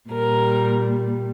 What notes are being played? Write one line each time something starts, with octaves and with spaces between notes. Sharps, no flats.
A#2 G3 A#4